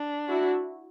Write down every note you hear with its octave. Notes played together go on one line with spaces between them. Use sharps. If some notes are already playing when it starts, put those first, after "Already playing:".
Already playing: D4
E4 F#4